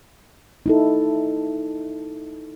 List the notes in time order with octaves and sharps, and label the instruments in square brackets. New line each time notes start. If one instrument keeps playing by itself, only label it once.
[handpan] D#4 E4 A4